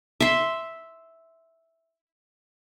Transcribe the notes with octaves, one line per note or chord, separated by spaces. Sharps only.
E5 C6